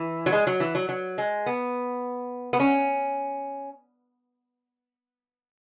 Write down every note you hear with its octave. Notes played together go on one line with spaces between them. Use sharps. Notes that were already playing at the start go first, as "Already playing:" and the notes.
Already playing: E3
F#3
G#3
F#3
E3
F#3
F#3
G#3
B3
B3
C#4